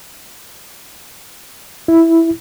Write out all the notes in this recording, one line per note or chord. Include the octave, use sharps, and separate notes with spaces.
E4